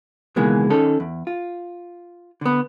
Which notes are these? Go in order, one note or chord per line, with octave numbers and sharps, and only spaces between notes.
C#2 B2 D#3 E3 G#3 A#3
D#3 C#4 A4
E2
F4
D3 B3